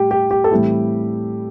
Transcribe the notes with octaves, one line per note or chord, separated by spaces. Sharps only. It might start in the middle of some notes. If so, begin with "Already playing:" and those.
Already playing: A2 G3 G4
G4
G4
A4
A2 E3 G3 C4 E4 G4